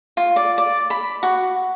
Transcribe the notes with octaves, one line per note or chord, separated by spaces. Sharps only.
F4
D5
D5
B5
F#4